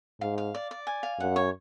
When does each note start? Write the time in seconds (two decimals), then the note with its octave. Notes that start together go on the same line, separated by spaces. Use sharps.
0.21 G#2 F5
0.38 F5
0.55 D5
0.71 D5
0.87 G#5
1.03 F5
1.19 F#2 F#5
1.36 C#5